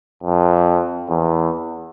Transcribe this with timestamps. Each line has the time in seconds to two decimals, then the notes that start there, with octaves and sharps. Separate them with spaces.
0.23 F2
1.09 E2